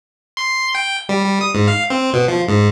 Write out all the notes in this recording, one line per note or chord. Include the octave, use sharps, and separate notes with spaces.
C6
G5
G3
G3
D#6
G#2
F5
C4
B2
F3
G#2